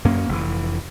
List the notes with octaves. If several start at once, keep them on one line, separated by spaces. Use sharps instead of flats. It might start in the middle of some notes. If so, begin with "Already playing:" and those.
F#2 A#3 C#4
F1 E3